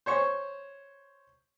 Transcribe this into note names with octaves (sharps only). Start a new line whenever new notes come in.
C5 C#5 C#6